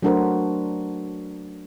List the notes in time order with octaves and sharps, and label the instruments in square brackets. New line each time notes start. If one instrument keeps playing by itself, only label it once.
[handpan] F#3 A3 D4 F#4 A#4 C5